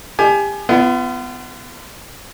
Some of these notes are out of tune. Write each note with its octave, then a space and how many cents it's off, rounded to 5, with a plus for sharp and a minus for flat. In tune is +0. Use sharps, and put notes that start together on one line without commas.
G4 +30 G#5 +30
B3 +20 F4 -35